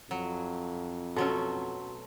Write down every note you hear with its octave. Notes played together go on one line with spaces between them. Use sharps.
F2 F#3
B2 F#3 A3 C#4 F#4 A4 C#5 C6